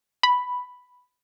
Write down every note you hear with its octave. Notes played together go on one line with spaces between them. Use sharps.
B5